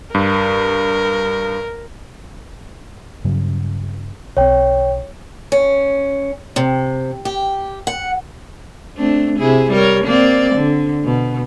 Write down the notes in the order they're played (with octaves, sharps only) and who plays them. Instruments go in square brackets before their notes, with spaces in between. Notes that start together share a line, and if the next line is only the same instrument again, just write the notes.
[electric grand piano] G2 [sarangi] A#4
[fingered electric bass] G2 C#3 F#3
[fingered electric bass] B1 C4 [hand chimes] C#5 G5
[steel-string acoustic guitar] C#4
C3
G4
F#5
[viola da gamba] A3 C4 D4
C3 E4 G#4
G3 A#4 C#5
A#3 C4 D5
D3
B2